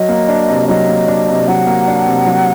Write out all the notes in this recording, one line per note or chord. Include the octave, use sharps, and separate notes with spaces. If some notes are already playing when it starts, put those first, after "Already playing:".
Already playing: F#3 D#5
A#3
D4
C3
F#3 D#5
A#3
D4
C3
F#3 F#5
A#3
D4
C3
F#3